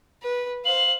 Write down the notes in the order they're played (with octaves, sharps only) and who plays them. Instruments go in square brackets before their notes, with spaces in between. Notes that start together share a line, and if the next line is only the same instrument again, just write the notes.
[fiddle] B4
[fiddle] C5 F5 [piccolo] F#7